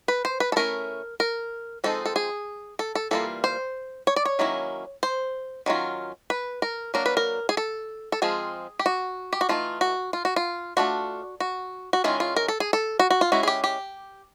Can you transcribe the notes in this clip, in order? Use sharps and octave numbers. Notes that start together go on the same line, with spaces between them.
B4
C5
B4
A4
A3 C#4 E4 A#4
A#4
F3 G#3 C4 D#4 A4
A4
G#4
A4
A4
E3 G3 A#3 F4 A4
C5
C#5
D5
C#5
D#3 F#3 A#3 C#4 E4
C5
D#3 F#3 C#4 F4
B4
A#4
F#3 A#3 D4 A#4
B4
A#4
G#4
A4
A4
F3 G#3 C4 F4 G#4
G4
F#4
G4
F#4
E3 A3 C4 D#4 F4
F#4
F4
F#4
F4
A3 D4 F4 F#4
F#4
F#4
D#3 G#3 C#4 E4 F4
F4
A#4
A4
G#4
A4
F#4
F#4
F4
G#3 C#4 E4 F#4
G#4
G4
G4